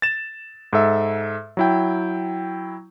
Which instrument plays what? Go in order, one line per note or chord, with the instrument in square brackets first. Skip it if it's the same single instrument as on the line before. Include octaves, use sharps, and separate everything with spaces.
[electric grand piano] A6 E7
G#2 A4 E5
F#3 E4 G5